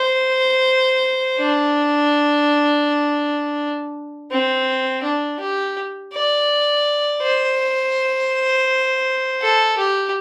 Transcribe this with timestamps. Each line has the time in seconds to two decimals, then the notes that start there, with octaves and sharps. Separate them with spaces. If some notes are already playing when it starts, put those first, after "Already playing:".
Already playing: C5
1.39 D4
4.31 C4
5.03 D4
5.40 G4
6.13 D5
7.22 C5
9.41 A4
9.78 G4